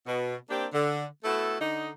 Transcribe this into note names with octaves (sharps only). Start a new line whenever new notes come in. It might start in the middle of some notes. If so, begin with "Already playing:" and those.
B2
A#3 C4 D4 G4
D3
A3 B3 E4 F#4 A4
D3 D#4